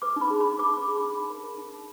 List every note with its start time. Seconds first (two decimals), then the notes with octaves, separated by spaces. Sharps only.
0.02 B4 D6
0.16 D#4 B5
0.30 G#4
0.40 D#4 B5
0.59 B4 D6
0.73 D#4 D6
0.88 G#4
0.97 D#4 B5
1.16 D#4
1.30 A#4
1.44 A#4
1.58 D#4
1.72 D#4